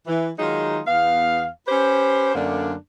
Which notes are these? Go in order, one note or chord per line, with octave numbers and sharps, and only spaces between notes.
E3
D#3 F#3 G#3 D#4 F4
E2 B3 F5
C#4 G4 B4 C5
F#2 D3 A3 A#3 D4